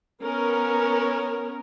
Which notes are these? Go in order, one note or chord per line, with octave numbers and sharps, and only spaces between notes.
B3 C#4 A#4